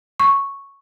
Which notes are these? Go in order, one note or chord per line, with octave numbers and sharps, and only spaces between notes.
C#6